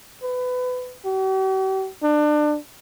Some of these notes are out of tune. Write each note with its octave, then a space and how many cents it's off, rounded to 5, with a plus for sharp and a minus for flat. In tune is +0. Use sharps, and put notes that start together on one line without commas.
B4 +25
G4 -45
D4 +25